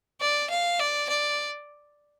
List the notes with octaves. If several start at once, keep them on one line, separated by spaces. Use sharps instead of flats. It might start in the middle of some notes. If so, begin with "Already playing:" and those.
D5
F5
D5
D5